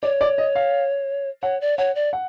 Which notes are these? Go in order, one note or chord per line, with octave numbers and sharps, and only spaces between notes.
C#5 D5
D5
D#5
F5
C#5 F#5
D5
C#5 F#5
D5
F#5